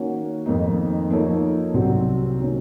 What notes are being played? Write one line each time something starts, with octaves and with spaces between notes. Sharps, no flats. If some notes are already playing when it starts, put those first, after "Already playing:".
Already playing: D#3 A#3 C#4 F#4
F2 D#3 A#3 D#4
F3 A#3 D#4 A4 C#5
C2 C3 F#3 C4 F#4
D#3 F#3 A#3 C#4